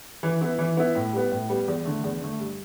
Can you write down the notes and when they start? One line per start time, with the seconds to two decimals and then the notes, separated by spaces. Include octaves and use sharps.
0.23 E3
0.41 B3 E4
0.59 E3
0.77 B3 E4
0.95 A2
1.13 G3 B3
1.31 A2
1.49 G3 B3
1.68 E2
1.85 D3 A3
2.04 E2
2.21 D3 A3
2.39 G2